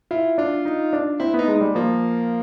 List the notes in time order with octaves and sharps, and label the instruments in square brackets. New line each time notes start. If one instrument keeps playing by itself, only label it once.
[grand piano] E4 [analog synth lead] F4
[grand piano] D4 [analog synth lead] F4
[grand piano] D#4
D4
[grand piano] C4 [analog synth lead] E4
[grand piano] B3
[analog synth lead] D#4
[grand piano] G#3
G3
[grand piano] F3 [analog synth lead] A#3